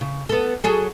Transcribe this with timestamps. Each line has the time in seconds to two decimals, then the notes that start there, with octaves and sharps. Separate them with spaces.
0.01 C#3
0.29 B3 A4
0.64 F#3 G#4 A4